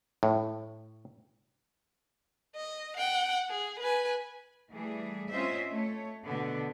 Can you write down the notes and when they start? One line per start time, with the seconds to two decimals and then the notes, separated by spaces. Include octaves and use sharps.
0.23 A2
2.55 D#5
2.97 F#5 G5
3.49 G#4
3.80 B4 G#5
4.72 E3 G3 A3 G#4
5.31 C4 C#4 F4 C5 D#5 E5
5.70 A3 C#5
6.25 B2 D3 B3